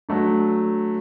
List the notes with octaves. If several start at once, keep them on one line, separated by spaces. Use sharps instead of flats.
F#3 A3 D4